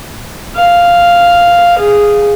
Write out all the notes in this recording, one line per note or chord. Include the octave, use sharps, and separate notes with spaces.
F5
G#4